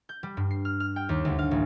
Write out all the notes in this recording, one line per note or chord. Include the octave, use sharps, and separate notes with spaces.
G6
G3
G2
C7
F6
F6
G5
D#2
D2
F5
A1